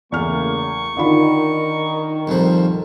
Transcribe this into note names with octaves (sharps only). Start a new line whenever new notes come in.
E2 C#3 A3 A#3 C#6 F6
D3 D#3 F4 B5
C2 F2 F3